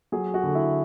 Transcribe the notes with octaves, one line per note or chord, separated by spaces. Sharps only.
F#3 G#4
F#4
D3
E4